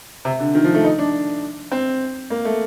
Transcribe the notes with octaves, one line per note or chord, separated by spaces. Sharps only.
C3
D3
D#3
F3
A3
D#4
D4
C4
A#3
A3